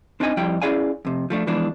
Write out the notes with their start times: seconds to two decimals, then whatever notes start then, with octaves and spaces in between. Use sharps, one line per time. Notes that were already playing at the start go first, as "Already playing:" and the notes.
0.20 C4 D4 D#4 D#5 E5 G#5
0.37 F2 G3 E4 G5
0.62 C#4 E4 G#4 D5 F5 G#5
1.05 F2 C3
1.30 F3 A3 D4
1.47 E3 F3 G#3 B3 D4